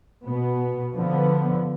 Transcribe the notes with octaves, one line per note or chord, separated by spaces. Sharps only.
B2 B3
D3 F3 B3